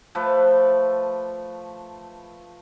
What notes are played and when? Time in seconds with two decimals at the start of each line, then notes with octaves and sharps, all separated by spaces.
0.15 F3 A3 B4